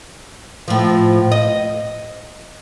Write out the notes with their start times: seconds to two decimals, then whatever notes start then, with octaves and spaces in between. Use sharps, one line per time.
0.68 A2 F3
1.32 D#5